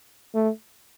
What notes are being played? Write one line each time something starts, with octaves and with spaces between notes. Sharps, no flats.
A3